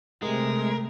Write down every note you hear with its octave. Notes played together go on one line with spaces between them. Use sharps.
C3 G#3 A3 A#4